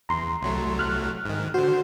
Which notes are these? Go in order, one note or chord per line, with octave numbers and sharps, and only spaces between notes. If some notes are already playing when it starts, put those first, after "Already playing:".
E2 A#5 C6
C2 F#3 A3
F6 F#6
G#2 D#3
D3 F#4 C5